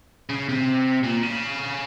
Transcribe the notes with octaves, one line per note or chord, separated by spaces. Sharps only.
C#3
C3
A#2
C#3